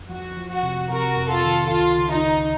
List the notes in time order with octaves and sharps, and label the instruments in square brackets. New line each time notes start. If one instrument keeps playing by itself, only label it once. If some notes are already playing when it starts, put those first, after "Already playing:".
Already playing: [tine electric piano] F2
[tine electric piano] F3 [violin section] F#4
[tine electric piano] F3
[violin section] F#4
[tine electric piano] C3
[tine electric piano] C3 [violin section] F#4 A#4
[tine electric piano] F2
[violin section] F4 A4
[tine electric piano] D#3
[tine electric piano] C#2 [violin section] F4
[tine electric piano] C#3
[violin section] D#4
[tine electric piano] C#2